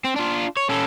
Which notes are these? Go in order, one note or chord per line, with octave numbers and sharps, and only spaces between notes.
C4
D4 F4
C#5
C#4 A4